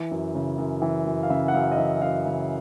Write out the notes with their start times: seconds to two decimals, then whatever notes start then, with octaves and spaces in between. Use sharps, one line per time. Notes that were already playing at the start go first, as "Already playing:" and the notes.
Already playing: E3
0.11 F#2
0.35 C#3
0.58 F#2
0.82 E3
1.06 F#2
1.23 F5
1.30 C#3 E5
1.48 F#5
1.54 F#2 F5
1.72 D#5
1.77 E3 E5
2.02 F#2 F5
2.26 C#3